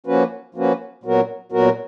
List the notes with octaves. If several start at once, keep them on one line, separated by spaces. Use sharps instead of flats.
F3 A#3 C#4 F#4 B4
F3 A#3 C#4 F#4 B4
A#2 F#3 B3 F#4 A#4
A#2 F#3 B3 F#4 A#4